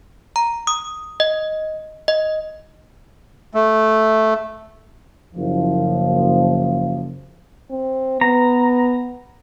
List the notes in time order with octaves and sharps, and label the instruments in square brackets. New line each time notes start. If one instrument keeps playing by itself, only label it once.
[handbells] A#5
D#6
D#5
D#5
[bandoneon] A3
[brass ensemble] F#1 F3
[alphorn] C4
[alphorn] B3 [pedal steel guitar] A#5